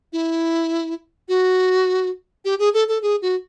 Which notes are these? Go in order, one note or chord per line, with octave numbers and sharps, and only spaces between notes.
E4
F#4
G4
G#4
A4
A4
G#4
F#4